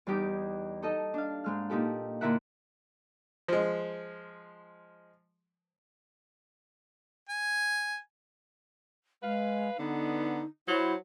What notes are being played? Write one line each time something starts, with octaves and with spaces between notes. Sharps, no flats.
E2 G3 D#4 G4 D6
D#4 A4 D#5
D4 F5
G#2 G#3 F6
A#2 D#4 G4 A4
A#2 D3 E4 A#4 E5 F#5
F3 G#3
G#5
G#3 B4 F5
D3 B3 D#4
F#3 E4 C5